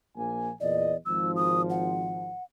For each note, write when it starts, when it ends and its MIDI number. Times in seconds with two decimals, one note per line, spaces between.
0.16 0.50 34
0.16 0.50 58
0.16 0.50 80
0.61 0.93 40
0.61 0.93 46
0.61 0.97 74
0.61 0.93 75
1.06 2.33 32
1.06 2.33 53
1.06 1.32 88
1.36 1.62 87
1.70 2.43 78